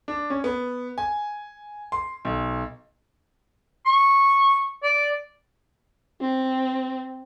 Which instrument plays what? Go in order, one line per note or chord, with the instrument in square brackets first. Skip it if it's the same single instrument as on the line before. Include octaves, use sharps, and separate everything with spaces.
[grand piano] D4
C#4
B3
G#5
C6
B1
[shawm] C#6
D5
[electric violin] C4